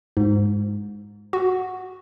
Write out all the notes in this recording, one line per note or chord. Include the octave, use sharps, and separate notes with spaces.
G#2
F#4